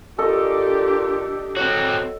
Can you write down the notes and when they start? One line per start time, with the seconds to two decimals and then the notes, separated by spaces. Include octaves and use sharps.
0.18 A#2 D4 G4 A4 D#5
1.56 F#3 C4 F#4